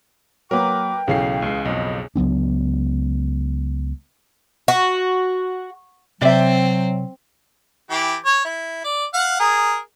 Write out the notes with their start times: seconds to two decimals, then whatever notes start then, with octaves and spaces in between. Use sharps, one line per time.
0.51 F#3 A#3 A#4 B4 G5 D6
1.08 B1 C#3 E3 C#4 A4 F5 C7
1.42 C#2 G#3
1.65 B1 F2 D#5
2.16 C#2 F#3 B3 D4
4.68 F#4
6.22 C3 F#3 C4 D5 E5
7.90 E3 G4
8.25 C#5
8.45 E4
8.84 D5
9.14 F5 F#5
9.40 G#4 A#4